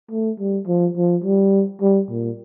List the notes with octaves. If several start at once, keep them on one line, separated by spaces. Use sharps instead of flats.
A3
G3
F3
F3
G3
G3
A#2